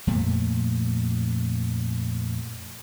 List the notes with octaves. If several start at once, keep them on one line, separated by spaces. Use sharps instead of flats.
F2 A#2 A3